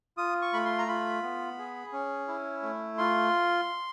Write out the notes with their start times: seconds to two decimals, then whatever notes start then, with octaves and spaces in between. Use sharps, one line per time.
0.18 F4 D#6
0.42 C#6
0.53 A3 B5
0.65 C6
0.79 A#5
0.88 F4 B5
1.22 B3
1.58 G#4
1.93 C#4
2.28 E4
2.62 A3
2.98 F4 C6